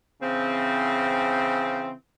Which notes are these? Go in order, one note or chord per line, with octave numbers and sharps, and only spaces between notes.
C#3 E3 C4